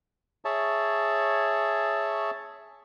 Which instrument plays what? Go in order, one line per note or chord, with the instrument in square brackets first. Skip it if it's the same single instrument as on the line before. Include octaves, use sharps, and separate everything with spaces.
[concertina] G#4 C#5 E5 A5